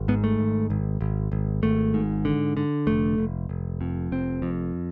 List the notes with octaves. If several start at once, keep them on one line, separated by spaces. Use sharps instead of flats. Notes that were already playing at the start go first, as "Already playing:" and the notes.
Already playing: G#1
G#2 B3
A3
G#1
G#1
G#1
G#1
G#1 A3
G#2
D3
D3
F1 A3
F1
F1
F2
F1 C4
F2